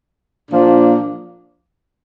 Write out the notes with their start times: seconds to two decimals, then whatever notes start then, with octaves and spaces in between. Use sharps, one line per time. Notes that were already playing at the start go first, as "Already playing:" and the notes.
0.51 A#2 F3 A#3 D4